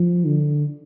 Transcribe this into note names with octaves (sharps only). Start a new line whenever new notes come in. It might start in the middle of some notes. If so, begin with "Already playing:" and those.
Already playing: F3
D3